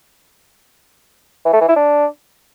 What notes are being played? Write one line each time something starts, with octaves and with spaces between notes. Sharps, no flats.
E3
A3
E3
E4
D4